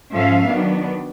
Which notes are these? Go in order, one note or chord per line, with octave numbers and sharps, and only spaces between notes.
G#2 F3 C#4 A4 E5 F5
D#3 F#3 B3 D4